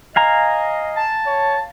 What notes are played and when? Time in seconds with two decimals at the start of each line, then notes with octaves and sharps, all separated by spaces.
0.16 D#5 F5 G#5 A#5
0.96 A5
1.26 C#5